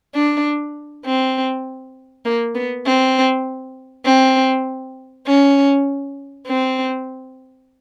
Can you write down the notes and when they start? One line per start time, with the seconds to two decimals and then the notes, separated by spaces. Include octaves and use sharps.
0.15 D4
1.05 C4
2.25 A#3
2.55 B3
2.86 C4
4.06 C4
5.27 C#4
6.47 C4